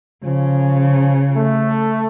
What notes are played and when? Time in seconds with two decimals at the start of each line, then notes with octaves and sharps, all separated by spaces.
0.24 C#3 F3
1.36 A3